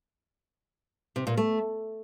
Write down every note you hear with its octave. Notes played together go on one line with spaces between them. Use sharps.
C3
A#2
A3